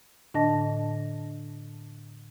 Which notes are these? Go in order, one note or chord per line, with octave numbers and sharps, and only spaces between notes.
A2 D3 D4 D#5 A5 A#6